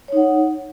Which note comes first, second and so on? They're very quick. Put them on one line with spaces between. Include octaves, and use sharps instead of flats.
C#5 D#4 F#5